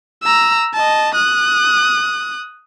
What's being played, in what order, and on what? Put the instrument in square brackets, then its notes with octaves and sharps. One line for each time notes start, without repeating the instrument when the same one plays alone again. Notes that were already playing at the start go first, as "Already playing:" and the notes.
[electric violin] A#5 E6
D#5 A5
D#6 F#6